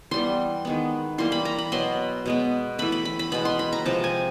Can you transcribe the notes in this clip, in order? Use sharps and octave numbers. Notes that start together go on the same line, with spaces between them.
E3 G3 B3 C6
D#3 G#3 B3
E3 G3 A#3 C6
B5
A#5
B5
B2 F#3 B3 C6
B2 G#3 B3
E3 A3 B5
B5
B5
B5
B2 G#3 B3 B5
C6
B5
A#5
C3 F3 G#3 A5
G#5